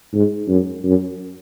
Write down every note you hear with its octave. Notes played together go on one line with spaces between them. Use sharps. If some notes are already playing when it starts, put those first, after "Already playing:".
G#2
F#2
F#2